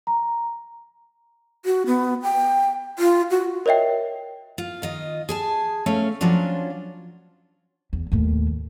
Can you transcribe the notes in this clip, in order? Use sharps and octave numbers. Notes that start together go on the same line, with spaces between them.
A#5
F#4
B3
G5
F4
F#4
A#4 C#5 D#5 E5 G5
F4
D#3 F4 D#5
G#4 G#5 A5
A3 C#4 F5
F3 F#3 C#4 D4 F4
E2
D#2 A2